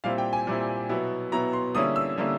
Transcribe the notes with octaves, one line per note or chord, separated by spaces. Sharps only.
A#2 G3 C4 E4 F5
G5
G#5
A#2 G3 C4 E4
B2 F#3 B3 E4
B2 F#3 B3 E4 A#5
C6
D3 G3 A#3 C#4 E4 D#6
E6
D3 G3 A#3 C#4 E4